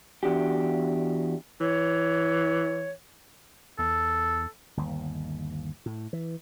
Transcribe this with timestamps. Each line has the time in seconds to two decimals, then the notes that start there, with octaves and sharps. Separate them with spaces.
0.23 E2 D4 F#4 G4
1.60 E3 C#5
3.79 E2 A4
4.77 G1 D#2
5.86 A2
6.13 E3